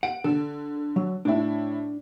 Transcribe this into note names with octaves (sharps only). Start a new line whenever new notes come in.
F#5 D7
D3 A4
F#3
A2 D4 E4